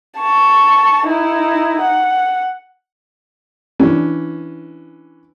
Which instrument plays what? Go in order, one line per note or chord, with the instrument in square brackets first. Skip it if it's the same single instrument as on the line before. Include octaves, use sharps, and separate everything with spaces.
[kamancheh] A5 C#6
D#4 E4
F#5
[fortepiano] E3 C#4 D4